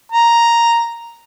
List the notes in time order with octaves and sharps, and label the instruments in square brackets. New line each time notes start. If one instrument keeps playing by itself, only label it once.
[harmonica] A#5